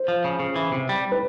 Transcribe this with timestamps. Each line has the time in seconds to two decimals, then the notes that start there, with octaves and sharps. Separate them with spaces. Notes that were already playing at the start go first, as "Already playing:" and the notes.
Already playing: C5
0.08 F3
0.24 C#3
0.40 C#3
0.56 E3
0.72 C3
0.89 G3
1.12 B4